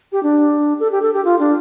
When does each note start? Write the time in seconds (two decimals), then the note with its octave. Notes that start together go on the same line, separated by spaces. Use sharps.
0.12 G4
0.23 D4
0.80 A4
0.92 G4
1.02 A4
1.14 G4
1.25 F4
1.39 D4